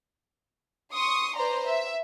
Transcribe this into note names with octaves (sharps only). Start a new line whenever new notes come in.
C6 C#6 D#6
B4 C5 D5 A#5 C6
E5